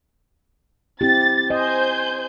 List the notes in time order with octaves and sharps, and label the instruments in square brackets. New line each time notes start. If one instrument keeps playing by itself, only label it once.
[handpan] C4 E4 G4 [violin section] A6
[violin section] C5 G#5 G6 [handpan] D#5